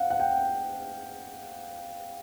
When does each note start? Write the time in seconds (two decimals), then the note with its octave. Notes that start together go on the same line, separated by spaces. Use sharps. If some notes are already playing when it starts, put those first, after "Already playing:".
Already playing: F5 F#5
0.10 F#5
0.20 G5